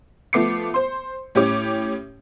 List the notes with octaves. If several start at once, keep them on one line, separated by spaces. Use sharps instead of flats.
F3 A3 B3 D6 C7 C#7
C5 C6
A2 C#4 G4 C#5 D6